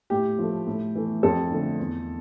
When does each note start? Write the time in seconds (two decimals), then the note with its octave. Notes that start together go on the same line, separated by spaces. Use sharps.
0.10 A2 G4
0.39 F3 A3
0.67 A2
0.95 E3 A3
1.23 F2 A4
1.51 D3 A3
1.80 E2